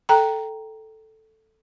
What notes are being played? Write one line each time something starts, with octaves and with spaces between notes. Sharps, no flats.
A4 G5 A#5